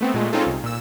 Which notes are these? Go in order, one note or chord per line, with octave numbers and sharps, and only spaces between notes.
A3 B3 C4
A#2 G#3 A3
G#3 C4 C#4 D#4 F4 A4
C2
A#2 E6